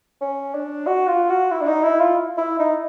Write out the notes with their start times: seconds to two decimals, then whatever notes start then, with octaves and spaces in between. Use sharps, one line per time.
0.21 C#4
0.54 D4
0.86 F#4
1.07 F4
1.30 F#4
1.51 E4
1.61 D4
1.67 D#4
1.83 E4
2.00 F4
2.38 E4
2.59 D#4